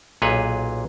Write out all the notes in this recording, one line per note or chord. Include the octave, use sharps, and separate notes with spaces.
B1 A#2 G#4 B4 C#5